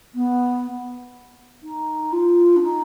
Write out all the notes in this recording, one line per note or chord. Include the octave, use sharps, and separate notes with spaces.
B3
D#4
F4
D4
D#4